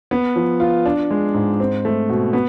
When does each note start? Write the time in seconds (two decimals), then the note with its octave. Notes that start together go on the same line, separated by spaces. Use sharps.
0.11 B3
0.36 F3
0.60 F4
0.85 D4
1.11 G#3
1.34 G#2
1.60 C4
1.85 A3
2.09 B2
2.33 B3